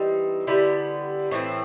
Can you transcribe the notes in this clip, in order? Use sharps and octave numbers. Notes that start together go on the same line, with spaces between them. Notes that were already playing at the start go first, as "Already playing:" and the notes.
Already playing: E3 G3 C4 D#4
D3 G3 B3 E4
A2 E3 A3 C4